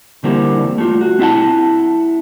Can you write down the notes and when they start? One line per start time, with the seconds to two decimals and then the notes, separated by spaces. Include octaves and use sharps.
0.24 D3 E3 G3 A#3 C4
0.78 A3 F4
1.01 F#4
1.19 C4 E4 G#4 E5 F#5 A5